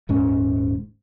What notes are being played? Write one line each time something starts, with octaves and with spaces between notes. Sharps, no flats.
D#1 G#2 C#4